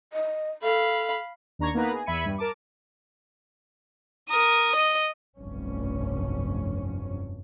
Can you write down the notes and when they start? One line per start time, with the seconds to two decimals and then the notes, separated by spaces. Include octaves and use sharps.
0.13 D#5
0.63 A4 F5 B5
1.59 D#2 D4 A#5 C#6 G#6
1.74 A#3 B3 D#4 B4 A#5
1.92 G#4
2.06 E2 E5 B5 G#6 C#7 D#7
2.25 G2
2.38 A#4 A5 D6
4.29 A#4 D#6
4.76 D#5
5.38 F1 B1 G2 C#4